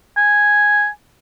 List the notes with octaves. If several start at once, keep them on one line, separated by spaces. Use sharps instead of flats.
G#5